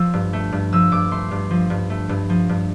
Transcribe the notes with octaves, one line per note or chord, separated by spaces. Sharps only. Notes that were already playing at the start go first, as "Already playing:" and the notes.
Already playing: F3 E6
G2
A3
G2
F3 E6
G2 D6
A3 C6
G2
F3
G2
A3
G2
F3
G2